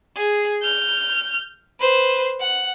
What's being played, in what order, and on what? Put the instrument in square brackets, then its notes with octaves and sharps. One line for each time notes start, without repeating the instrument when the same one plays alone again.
[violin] G#4
F6 G6
B4 C5
F#5